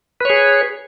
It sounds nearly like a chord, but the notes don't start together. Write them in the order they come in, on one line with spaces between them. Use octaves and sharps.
B4 C#5 G#4